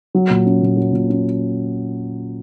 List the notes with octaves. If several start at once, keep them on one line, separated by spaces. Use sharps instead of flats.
F#3
A#2
C#4
A#2
F#3
A#2
C#4